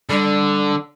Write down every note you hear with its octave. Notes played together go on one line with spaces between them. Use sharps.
D3 G3